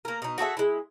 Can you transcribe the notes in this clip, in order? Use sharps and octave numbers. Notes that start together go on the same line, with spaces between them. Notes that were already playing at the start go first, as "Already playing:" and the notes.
A#3 A#4
B2 D#4
F#4 G#4 A4 E5
G#3 E4